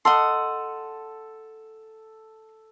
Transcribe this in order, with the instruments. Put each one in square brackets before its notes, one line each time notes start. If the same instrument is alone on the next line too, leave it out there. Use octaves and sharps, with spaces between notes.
[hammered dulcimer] A4 [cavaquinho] D#5 F#5 C6